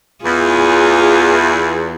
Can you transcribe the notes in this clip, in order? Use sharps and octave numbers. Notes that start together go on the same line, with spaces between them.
E2 F4 G#4